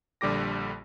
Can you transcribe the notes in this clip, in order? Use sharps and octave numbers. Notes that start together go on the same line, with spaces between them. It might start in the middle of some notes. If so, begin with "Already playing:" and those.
A#1 D3 G3 G4 D6 A#6